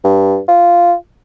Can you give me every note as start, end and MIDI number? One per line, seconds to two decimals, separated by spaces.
0.04 0.39 43
0.48 0.94 65